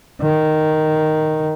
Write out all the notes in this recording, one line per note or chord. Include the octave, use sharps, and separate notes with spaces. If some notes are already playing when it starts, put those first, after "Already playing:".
D#3